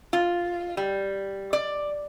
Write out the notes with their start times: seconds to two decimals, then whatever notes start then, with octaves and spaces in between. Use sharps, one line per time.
0.13 F4
0.77 G3
1.53 D5